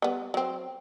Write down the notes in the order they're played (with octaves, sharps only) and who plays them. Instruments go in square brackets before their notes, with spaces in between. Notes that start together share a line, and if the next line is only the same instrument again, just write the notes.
[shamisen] G3 B3
F#3 C4